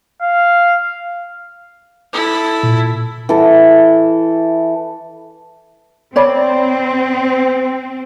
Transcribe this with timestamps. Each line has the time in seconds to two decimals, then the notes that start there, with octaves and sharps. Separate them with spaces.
0.22 F5
2.13 E4 A4
2.63 A#2
3.29 E3 A4
6.16 C4 C#5 D5 B5